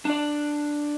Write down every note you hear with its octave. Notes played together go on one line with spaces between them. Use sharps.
D4 D5